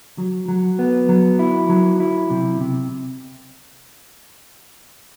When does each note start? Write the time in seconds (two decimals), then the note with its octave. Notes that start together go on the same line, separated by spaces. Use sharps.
0.18 F#3
0.48 F#3
0.79 B3
1.09 F#3
1.39 E4
1.69 F#3
2.00 E4
2.31 C3
2.61 C3